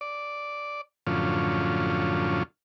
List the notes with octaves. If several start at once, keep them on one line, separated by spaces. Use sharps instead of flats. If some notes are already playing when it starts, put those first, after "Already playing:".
D5
F#2 A2 D3 F3 C#4 F4